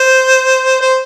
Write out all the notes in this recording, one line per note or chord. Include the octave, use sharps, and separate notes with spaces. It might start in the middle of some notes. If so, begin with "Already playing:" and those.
Already playing: C5
C5